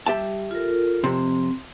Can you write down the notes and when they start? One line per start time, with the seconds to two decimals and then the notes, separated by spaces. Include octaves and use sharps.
0.06 G3 G4 E5 A5
0.51 F4 A4 A#4
1.04 F2 C3 C4